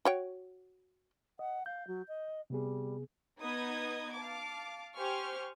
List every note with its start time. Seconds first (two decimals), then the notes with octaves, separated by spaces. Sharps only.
0.05 F#4 C#5 G5
1.39 D#5 F#5
1.66 F5 G6
1.87 F#3
2.08 D#5
2.50 C3 G3 B3 G#4
3.40 B3 D#4 B4 D#5 D#6 G#6
4.14 F5 A5 D6
4.94 G4 C5 G#5 C#6 F6